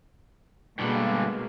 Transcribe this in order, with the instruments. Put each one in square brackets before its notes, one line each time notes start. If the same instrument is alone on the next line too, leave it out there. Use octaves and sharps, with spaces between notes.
[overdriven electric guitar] G2 D3 [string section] B2 G#3 A#3